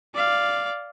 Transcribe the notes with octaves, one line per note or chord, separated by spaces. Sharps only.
D5 F5